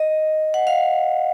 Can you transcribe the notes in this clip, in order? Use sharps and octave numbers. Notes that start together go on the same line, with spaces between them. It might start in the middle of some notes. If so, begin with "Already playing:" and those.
Already playing: D#5
F#5
F5